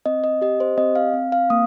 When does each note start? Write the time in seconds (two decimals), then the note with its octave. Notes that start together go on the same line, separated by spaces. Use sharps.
0.06 C4 D#5
0.24 D#5
0.42 G4 D#5
0.60 C5
0.78 C4 D#5
0.96 F5
1.14 C4
1.32 F5
1.50 A#3 D#6